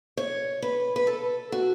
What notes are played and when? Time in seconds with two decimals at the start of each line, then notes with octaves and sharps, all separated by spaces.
0.17 C#5
0.62 B4
0.96 B4
1.07 A4
1.52 F#4